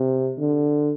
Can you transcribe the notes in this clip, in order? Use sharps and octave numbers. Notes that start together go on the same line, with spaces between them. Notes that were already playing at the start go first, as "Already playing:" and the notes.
Already playing: C3
D3